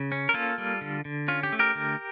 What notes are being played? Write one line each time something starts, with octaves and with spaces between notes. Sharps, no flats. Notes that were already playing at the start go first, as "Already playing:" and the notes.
Already playing: C#3
C#4
A#4
A#3 F4 A4
G3
D3
D3
C#4 F4
G4
A3
G4 A#4
D3